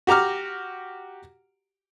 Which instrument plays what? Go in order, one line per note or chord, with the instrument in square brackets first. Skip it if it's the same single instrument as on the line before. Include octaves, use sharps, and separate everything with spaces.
[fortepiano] F#4 G4 A#5 D6 F6